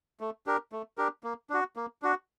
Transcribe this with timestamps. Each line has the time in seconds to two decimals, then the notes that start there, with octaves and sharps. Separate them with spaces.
0.20 A3
0.46 D4 G4 A#4
0.72 A3
0.98 D4 G4 A#4
1.24 A#3
1.50 D4 F#4
1.76 A#3
2.02 D4 F#4